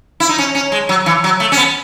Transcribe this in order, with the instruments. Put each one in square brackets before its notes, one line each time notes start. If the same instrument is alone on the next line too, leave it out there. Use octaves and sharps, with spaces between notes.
[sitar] E4
D#4
C#4
C#4
G#3
F#3
E3
F#3
A3
C#4
B3